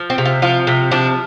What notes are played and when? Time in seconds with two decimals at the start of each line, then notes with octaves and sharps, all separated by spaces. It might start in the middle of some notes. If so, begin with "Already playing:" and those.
Already playing: F3
0.10 C4
0.18 C3
0.25 F4
0.42 F3 F4
0.67 C3
0.91 F3 D4